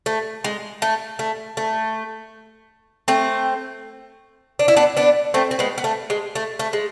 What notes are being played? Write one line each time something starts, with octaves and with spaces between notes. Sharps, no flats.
A3
G#3
A3
A3
A3
A3 C4
D4
E4
B3 D4
B3 D4
A3 C4
C4
G#3 B3
B3
A3
G#3
A3
A3
G#3